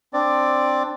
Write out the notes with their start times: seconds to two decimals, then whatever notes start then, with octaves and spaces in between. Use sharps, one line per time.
0.13 C4 D4 D5